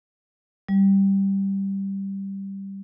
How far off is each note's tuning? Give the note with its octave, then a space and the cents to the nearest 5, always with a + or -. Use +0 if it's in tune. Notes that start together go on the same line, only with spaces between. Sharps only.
G3 +0